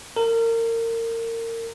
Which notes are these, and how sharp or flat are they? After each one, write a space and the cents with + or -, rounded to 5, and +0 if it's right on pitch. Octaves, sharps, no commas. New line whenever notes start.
A#4 -30